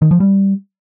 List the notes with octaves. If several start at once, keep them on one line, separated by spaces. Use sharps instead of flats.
D#3
F3
G3